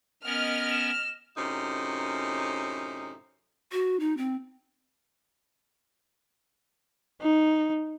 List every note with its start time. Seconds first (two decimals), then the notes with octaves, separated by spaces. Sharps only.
0.25 B3 C#4 A#4 D#5 F6
0.71 E7
1.37 F#2 A2 C3 C#4 D#4
3.72 F#4
4.00 D#4
4.17 C4
7.21 D#4